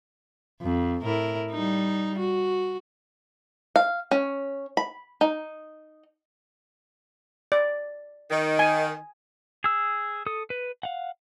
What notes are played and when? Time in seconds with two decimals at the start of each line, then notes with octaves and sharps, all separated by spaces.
0.62 F2
1.03 A2 E4 A#4
1.51 G3 D#4
2.18 F#4
3.76 F5
4.11 C#4
4.77 B5
5.21 D#4
7.52 D5
8.31 D#3
8.59 G#5
9.64 G#4 E6
10.26 A4 D#6
10.50 B4
10.83 F5 F#5